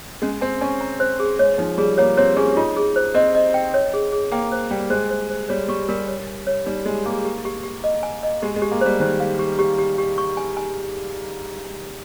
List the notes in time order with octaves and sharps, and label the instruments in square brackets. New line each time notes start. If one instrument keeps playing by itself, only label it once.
[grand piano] G#3 [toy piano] C#4
[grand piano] C4 [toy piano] G#5
[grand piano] C#4 [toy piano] G#5
[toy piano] A#5
C5
G#4
[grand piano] G#3 [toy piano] C#5
[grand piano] F3 [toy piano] D#4
[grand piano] G3 [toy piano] G#4
[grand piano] A#3 [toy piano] C#5
[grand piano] C4 [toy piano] C#5
[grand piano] C#4 [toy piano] G#4
[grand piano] D#4 [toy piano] F4
[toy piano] G#4
C5
[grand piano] C4 [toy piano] D#5
[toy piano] D#5
G5
C#5
G#4
G#4
[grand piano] A#3 [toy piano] G5
[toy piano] C5
[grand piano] G3 [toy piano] G5
[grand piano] G#3 [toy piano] C5
[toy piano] C5
C5
[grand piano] G3 [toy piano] C#5
[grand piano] G3 [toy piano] C#6
[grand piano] G3 [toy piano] A#4
[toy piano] C#5
G#5
C#5
[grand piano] G3 [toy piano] D#4
[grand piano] G#3 [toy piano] D#4
[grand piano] A#3 [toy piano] G#4
[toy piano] G4
G4
G4
D#5
G#5
D#5
[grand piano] G#3 [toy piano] G4
[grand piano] G#3
[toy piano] G4
[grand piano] A#3
[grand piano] G3 [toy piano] C5
[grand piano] D#3 [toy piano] C5
[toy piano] F5
G4
G4
G4
G4
C#6
G#5
G#5